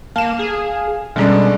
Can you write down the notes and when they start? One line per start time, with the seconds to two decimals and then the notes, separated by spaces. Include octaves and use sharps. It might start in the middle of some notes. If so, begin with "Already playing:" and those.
0.16 A#3 F5 A5 E7
0.39 G#4
1.16 B2 D3 G3 G#3 C#4 D4